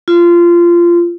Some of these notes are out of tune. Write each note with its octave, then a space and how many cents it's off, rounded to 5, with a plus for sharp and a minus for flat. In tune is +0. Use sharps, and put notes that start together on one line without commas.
F4 -20